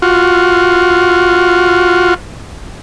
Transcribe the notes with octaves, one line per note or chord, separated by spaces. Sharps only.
F4 F#4